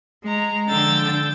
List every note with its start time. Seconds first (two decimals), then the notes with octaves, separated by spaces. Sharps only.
0.25 G#3 A#5
0.69 D3 F3 G5 E6 A6